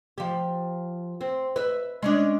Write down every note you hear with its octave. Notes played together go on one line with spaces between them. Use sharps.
F3 G4
C4
B4 E5
G#3 C#4 D4